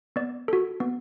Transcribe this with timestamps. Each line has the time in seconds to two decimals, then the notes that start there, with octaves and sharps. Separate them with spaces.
0.16 B3 D5
0.48 F#4 A4
0.80 B3